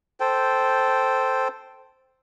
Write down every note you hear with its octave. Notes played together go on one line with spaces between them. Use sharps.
A4 C5 G5